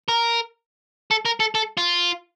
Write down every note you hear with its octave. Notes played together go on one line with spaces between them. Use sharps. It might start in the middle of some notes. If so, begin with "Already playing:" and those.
A#4
A4
A#4
A4
A4
F4